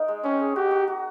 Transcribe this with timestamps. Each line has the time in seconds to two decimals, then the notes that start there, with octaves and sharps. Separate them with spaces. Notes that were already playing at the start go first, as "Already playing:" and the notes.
Already playing: D#4 A#4
0.08 G#3
0.24 C4 C#4
0.40 G#4
0.56 F#4 G4
0.71 F#4
0.88 F#4